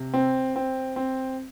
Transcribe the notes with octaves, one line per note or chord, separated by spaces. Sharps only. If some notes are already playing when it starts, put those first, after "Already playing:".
Already playing: C3
C4
C4
C4